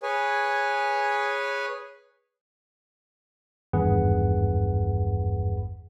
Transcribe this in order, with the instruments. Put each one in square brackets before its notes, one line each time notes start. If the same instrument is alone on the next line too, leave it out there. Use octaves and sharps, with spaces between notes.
[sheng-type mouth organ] G#4 B4 C#5 G#5
[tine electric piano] G#1 E2 G2 G#4 B4 F#5